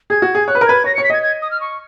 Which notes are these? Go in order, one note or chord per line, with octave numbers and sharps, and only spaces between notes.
G#4 G#6
F#4
G#4
C#5 F#6
B4
A#4
B4 G#6
C#5 A#6
C#5 C#7
B6
D#5 G#6
G#6
D#6
F6
C#6